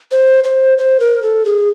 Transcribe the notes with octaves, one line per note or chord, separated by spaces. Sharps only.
C5
C5
C5
A#4
A4
G#4